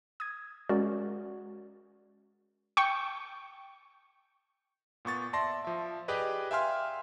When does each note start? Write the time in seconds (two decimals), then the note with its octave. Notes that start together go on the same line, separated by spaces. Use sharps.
0.20 D#6 G#6
0.69 G#3 C#4 F#4 A#4 D5
2.77 G5 C#6
5.05 A#2 B3 C#6 A6
5.33 D5 E5 A5 C6 A#6
5.65 F3 E5
6.08 G4 G#4 B4 D5 D#5
6.51 E5 F5 G5 G#5 C6 F6